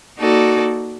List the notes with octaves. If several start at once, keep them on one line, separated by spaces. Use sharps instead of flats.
A#3 D#4 F#4 A4 D5